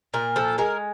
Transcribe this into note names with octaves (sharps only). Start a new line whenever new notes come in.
A#2 A#4
F3 A4
G#3 A#4